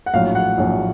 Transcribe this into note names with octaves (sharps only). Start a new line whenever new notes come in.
F#5
A#1 A2 F#3 F5
F#5
A#1 A2 F#3